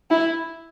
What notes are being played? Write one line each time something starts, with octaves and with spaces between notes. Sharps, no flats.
E4